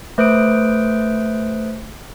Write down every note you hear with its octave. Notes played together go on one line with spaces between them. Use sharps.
A3 B4 C5 D#6 D7